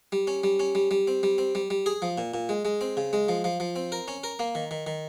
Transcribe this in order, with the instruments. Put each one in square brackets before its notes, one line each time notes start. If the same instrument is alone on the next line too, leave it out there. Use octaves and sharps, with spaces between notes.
[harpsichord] G3
C#4
G3
C#4
G3
G3
C4
G3
C4
G3
G3
G#4
F3
A#2
A#2
G#3
G#3
C4
C#3
G#3
F3
F3
F3
C4
A#4
C#4
A#4
A#3
D#3
D#3
D#3